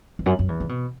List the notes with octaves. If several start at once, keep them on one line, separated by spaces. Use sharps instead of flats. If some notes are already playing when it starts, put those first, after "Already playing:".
E2
F#2
F#2
E2
C#3
B2